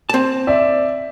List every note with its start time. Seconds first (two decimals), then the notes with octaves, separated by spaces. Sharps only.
0.09 C4 A5
0.47 D5 E5